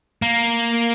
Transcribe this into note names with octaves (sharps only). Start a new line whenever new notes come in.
A#3